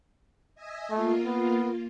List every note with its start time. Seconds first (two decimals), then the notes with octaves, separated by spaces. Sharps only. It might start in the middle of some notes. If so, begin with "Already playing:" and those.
0.55 D#5 E5 G#5
0.91 A3 A#3 F4
1.25 B3